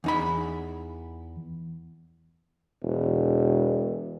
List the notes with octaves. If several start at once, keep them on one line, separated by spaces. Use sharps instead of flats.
E2 D#4 B5
E1